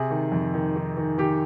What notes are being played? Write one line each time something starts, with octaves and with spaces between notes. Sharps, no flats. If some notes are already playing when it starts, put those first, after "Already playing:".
Already playing: C3 G#4
D#3
F2
D#3
D#3
D#3
D#3 G4